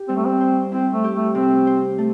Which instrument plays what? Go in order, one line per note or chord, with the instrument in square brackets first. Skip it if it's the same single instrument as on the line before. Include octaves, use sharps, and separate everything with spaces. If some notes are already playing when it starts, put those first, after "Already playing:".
Already playing: [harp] G4
[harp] G3 [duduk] C4
[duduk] A3
C4
[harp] C5
[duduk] C4 [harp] E4
[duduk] A3
[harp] G4
[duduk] A3
[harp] C3 [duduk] C4
[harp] C5
A3